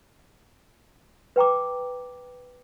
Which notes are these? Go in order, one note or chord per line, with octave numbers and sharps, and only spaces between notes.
B4 G5 A#5 D6